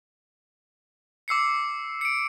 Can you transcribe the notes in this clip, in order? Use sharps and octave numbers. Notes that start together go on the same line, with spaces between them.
D6 E6 C7 C#7
C#7 D7